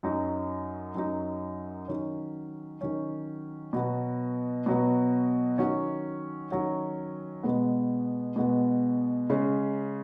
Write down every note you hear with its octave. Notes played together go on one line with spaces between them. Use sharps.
F#2 F#3 D#4
F#2 F#3 D#4
D#3 F#3 C#4
D#3 F#3 C#4
B2 F#3 B3
B2 F#3 B3
D#3 F#3 C#4 F#4
D#3 F#3 C#4 F#4
B2 G#3 B3
B2 G#3 B3
C#3 G#3 C#4